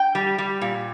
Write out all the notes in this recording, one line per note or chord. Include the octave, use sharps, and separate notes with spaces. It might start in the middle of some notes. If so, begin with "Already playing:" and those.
Already playing: G5
G3
G3
A#2